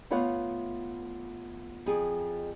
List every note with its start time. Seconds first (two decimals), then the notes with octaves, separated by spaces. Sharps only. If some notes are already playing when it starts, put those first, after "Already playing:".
0.11 A3 B3 F4 C#5 F5 F#5
1.86 F2 G#4